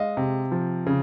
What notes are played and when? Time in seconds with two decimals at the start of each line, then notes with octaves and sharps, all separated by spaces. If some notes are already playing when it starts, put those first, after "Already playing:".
Already playing: G#3 D#5 F5
0.17 C3
0.52 F3
0.86 C#3